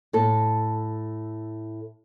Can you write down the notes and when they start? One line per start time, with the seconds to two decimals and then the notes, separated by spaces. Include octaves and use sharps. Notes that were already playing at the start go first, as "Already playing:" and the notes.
0.13 A2 A4